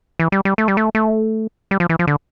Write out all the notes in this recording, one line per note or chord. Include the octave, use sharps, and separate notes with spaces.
E3
G3
G3
A3
G3
A3
A3
G3
F3
E3
F3
D3